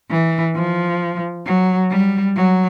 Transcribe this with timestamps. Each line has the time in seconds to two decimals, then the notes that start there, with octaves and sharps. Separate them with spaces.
0.11 E3
0.56 F3
1.46 F#3
1.91 G3
2.36 F#3